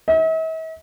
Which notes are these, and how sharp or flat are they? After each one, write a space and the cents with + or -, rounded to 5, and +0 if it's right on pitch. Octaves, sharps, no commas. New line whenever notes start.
E5 -45